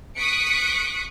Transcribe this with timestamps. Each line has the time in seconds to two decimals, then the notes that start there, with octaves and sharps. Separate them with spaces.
0.17 C#6 D#6 F#6 B6 C#7 D7